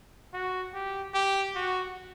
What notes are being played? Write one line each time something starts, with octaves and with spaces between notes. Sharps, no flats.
F#4
G4
G4
F#4